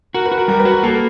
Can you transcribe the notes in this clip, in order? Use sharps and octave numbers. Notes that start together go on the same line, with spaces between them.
F#4 A#4
B4
F#4
A#4
G3 A#4
B4
F#4
A#4
A#3 A4